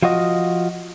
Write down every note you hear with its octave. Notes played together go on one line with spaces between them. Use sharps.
F3 F4 F#4 D#5